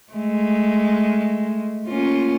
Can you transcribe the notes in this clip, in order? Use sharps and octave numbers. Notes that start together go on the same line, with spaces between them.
G#3 A3
A#3 C#4 F4